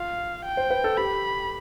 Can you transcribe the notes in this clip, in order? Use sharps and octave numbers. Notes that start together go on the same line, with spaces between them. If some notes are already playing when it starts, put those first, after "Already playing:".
Already playing: F4 F5
G5
C5
B4
A4
G4 B5